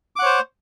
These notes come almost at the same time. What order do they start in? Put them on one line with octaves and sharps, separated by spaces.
D6 F#5 C#5 C5